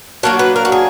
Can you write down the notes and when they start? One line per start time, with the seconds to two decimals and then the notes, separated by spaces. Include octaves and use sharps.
0.23 F#3 A#3 D4 F#4
0.39 B4
0.56 A#4
0.65 F#4
0.72 G#4